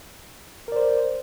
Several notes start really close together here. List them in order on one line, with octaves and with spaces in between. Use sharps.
A#4 D5 C5